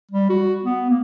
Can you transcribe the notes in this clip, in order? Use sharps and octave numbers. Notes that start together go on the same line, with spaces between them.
G3
F#4
B3
A#3